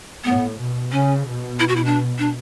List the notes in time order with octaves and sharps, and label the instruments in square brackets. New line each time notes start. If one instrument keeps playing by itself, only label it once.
[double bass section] A2 [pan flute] B3
[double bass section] B2
[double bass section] C#3 [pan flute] C#4
[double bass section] B2
[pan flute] E4
F#4
E4
D4
D4